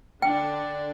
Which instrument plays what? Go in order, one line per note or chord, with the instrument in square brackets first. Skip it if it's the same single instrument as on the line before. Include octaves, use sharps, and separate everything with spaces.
[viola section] D3 D4 [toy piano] G5